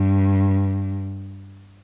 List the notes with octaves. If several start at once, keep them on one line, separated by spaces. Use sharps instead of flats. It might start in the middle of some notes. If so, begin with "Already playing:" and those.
Already playing: G2